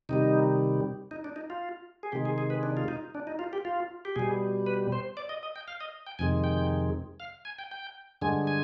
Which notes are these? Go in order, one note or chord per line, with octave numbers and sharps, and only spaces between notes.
C3 D#3 G3 D#4
D#4
D4
D#4
F4
G#4
C3 D#3 G#3 G4
G#4
G#4
B4
D4
F4
D#4
D4
D#4
F4
G4
F4
G4
B2 G3 G#4
B4
C5
D5
D#5
D#5
G5
F5
D#5
G5
F2 C3 D#3 G#3 G#5
G5
F5
G#5
G5
G5
G2 D3 G#3 G#5
G#5